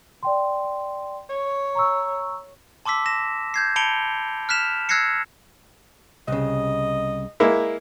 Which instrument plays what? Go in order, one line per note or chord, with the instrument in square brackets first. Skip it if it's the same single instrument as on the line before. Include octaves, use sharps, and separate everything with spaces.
[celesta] D5 G5 C6
[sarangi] C#5
[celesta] A#5 C#6 E6
[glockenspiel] A5 C6 D6 E6 B6
A#6 E7
G6 G#6 C7
A5 B5 C#7 D7 F7 G7
F6 F#6 B6 E7 F7
E6 F#6 G#6 A#6 C7 C#7
[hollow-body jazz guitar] C2 C#3 [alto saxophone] D#5
[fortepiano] G#3 A#3 E4